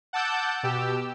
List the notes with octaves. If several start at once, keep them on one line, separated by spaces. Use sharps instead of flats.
F#5 A5 D6 E6 G6 A6
B2 G4 E6